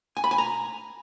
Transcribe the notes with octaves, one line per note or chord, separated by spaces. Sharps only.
G#5
B5
G#5
A#5